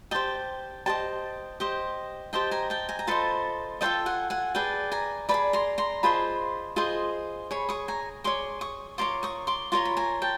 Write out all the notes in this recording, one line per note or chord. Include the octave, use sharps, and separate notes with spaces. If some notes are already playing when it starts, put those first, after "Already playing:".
G4 C5 D#5 G5 A5
G4 C5 D#5 G5 A5
G4 C5 D#5
G4 C5 D#5 G5 A5
G#5 A#5
G5 A5
G#5 A#5
A#5
F4 A4 C5 D#5 A5 B5
F4 A4 C5 D#5 G5 A5
F#5 G#5
F#5 G#5
G#4 B4 D5 G5 A5
G#5 A#5
B4 D5 A5 B5
G#4
A#5 C6
A#5 C6
F4 G#4 C5 D#5 A5 B5
F4 G#4 C5 D#5
G#4 C#5 B5 C#6
C#6 D#6
G#5 A#5
G#4 C#5 C6 D6
C#6 D#6
F4 A#4 C#5 C6 D6
C#6 D#6
C6 D6
F4 A#4 C#5 A#5 C6
B5
G#5 A#5
G5 A5